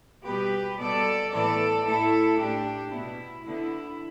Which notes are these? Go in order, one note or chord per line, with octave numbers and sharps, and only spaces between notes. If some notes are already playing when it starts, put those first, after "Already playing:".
B2 G3 B3 G4 B4
B2 G3 B3 A4 D5
A2 E3 B3 A4 D5
A2 A3 E4 A4
A2 A3 D4 G4
B2 B3 E4
D3 B3 E4